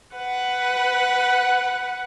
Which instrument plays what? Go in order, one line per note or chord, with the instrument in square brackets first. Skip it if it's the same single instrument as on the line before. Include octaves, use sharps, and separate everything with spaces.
[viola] B4 F#5